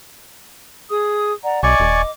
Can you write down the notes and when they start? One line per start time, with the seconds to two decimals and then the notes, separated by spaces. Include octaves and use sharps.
0.91 G#4 D#6
1.43 D5 F#5 A#5
1.63 B1 D5 D#5 G#5 C#6 D6
1.80 D#1